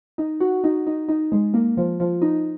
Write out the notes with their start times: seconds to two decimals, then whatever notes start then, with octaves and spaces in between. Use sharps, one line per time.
0.18 D#4
0.40 F#4
0.64 D#4
0.87 D#4
1.08 D#4
1.32 G#3
1.54 A#3
1.77 F3
2.00 F3
2.22 D#4